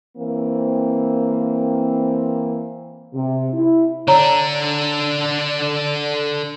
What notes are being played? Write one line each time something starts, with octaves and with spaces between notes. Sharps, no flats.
E3 A#3 C4
C3
E4
D3 D4 C#5 D5 A#5